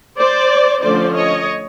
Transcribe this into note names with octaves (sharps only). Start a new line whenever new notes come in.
C5 D5
D3 F3 A3 C#4 C5 D5
C#5 D#5